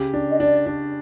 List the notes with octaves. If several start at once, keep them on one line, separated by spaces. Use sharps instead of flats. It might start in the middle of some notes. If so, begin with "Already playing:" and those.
Already playing: C#3 G4
D4
D#5
D4 D5
D4